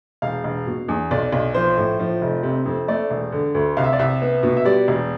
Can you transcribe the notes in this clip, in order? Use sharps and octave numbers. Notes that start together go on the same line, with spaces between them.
E1 F5
E1
B2
E2
B1 D5
B1
F3 C5
A2
F3
F1
C3
F2
A3 D5
E1
D3
D2
C2 F5
E5
D5
C2 E5
B3
B2
E5
G3 D5
E1